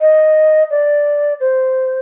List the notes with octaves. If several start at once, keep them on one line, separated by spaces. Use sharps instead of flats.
D#5
D5
C5